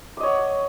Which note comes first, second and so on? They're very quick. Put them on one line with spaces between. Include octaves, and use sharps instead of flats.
D6 D#5 C#5 F#5